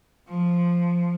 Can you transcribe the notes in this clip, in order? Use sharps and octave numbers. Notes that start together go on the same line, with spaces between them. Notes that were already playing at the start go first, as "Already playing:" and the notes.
F3